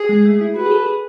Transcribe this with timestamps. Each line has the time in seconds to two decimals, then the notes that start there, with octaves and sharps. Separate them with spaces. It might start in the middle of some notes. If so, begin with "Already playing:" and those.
Already playing: G#4
0.09 G#3
0.25 A3
0.41 E4
0.56 F#4 B4
0.66 G#4
0.71 A4
0.86 G#4